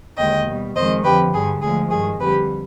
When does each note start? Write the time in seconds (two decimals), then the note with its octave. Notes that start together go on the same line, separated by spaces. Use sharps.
0.17 D#2 D3 G#3 D#5 G5
0.46 B2 G3
0.76 F2 D#3 G#3 C5 D#5
1.04 F2 D3 F3 G4 B4
1.33 G2 D3 G3 G#4
1.62 D2 D3 F3 G#3 G#4
1.91 G2 D#3 G#3 G#4
2.19 F2 D3 G3 G4 B4